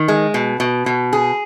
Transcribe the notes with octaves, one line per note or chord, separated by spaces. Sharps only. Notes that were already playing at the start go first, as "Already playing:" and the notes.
Already playing: D#3
G#3
B2
B2
B2
G#4